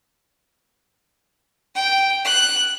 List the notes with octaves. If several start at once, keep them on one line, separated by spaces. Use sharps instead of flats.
G5
F#6